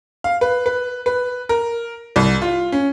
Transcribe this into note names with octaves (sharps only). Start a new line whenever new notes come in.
F5
B4
B4
B4
A#4
C2
F4
C#4